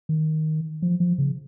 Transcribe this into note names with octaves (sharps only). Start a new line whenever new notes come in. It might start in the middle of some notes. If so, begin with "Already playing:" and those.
D#3
F3
F3
C#3